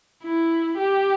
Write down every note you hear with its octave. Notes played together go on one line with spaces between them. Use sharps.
E4
G4